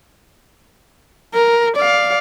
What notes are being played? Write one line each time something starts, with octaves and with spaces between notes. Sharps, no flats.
A#4
D5 F5